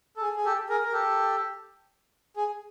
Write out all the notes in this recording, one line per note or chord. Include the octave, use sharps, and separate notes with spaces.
A4
G#4
G#4
G4 A4
G#4 A#4
A#4
G4 A4
G#4